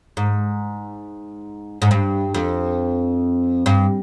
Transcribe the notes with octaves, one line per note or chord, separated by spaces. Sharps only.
G#2
G#2
G2
F2
G2